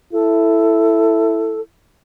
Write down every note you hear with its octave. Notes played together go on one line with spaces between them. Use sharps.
E4 A4